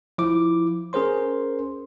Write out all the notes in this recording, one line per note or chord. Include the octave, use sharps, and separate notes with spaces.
F3 E4 D6
C#4 G#4 A#4 C5 C6